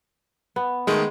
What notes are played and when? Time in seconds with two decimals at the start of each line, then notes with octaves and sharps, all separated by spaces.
0.56 B3
0.87 D#3 G#3 A3 G#4